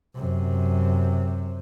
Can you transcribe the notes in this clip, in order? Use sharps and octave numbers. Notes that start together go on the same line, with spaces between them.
F#2 C3